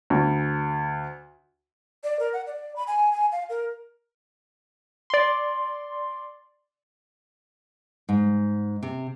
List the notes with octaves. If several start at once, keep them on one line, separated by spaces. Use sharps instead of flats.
D2
D5
A#4
F#5
D5
B5
G#5
G#5
F5
A#4
D5 C6
G#2
C3